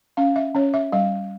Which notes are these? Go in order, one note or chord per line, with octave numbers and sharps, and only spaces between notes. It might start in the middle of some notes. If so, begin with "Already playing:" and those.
C#4 F5
E5
C#4 C#5
E5
G3 F5